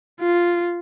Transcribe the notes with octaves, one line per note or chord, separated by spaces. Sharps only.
F4